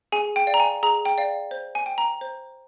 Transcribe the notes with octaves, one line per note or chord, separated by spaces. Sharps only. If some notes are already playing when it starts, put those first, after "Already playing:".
G#4 G#5
G5
D5 F5
A#5
G#5
G#4 A#5
G5
D5 F5
C5
G#5
G5
A#5
C5